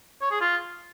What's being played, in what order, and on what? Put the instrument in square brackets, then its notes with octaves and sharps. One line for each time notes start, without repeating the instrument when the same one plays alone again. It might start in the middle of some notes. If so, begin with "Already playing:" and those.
[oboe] C#5
G#4
F4